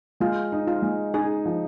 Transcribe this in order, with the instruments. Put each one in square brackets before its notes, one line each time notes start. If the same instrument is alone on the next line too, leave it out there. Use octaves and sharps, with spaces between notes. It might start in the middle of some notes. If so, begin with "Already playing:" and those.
[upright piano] G#3 [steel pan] F4
[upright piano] D#4
[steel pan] F4
[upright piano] G#3
[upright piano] D#4 [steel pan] G#4
[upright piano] F3